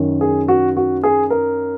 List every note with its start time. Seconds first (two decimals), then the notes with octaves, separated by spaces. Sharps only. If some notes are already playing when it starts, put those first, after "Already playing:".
Already playing: F#2 D#3
0.21 G#4
0.48 F#4
0.77 F#4
1.03 G#4
1.30 A#4